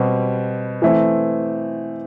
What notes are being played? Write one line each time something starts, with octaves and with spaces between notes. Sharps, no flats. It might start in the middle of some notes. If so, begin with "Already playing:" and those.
Already playing: B2 G3 C4 G4
E3 A3 C4